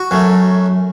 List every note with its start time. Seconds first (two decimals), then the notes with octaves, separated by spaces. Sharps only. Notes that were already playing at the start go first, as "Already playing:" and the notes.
Already playing: F#4
0.11 F#2 F#3 A3